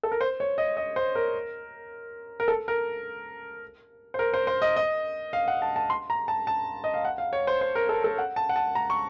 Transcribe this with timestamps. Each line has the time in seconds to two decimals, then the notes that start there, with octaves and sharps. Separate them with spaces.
0.03 A4
0.12 A#4
0.21 C5
0.40 C#5
0.58 D#5
0.77 D#5
0.96 C5
1.15 A#4
2.40 A#4
2.48 A4
2.68 A#4
4.14 C5
4.19 A#4
4.34 C5
4.47 C5
4.62 D#5
4.76 D#5
5.33 F5
5.48 F#5
5.62 A5
5.76 A5
5.90 C6
6.10 A#5
6.28 A5
6.47 A5
6.84 D#5
6.94 F5
7.05 F#5
7.18 F5
7.33 C#5
7.47 C5
7.61 C5
7.75 A#4
7.89 A4
8.04 A4
8.18 F#5
8.36 A5
8.49 F#5
8.56 A5
8.75 A#5
8.90 C#6